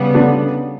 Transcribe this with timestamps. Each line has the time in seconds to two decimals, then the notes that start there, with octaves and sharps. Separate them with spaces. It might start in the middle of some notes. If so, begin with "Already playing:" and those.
Already playing: C#3 G3 B3
0.15 D3 D4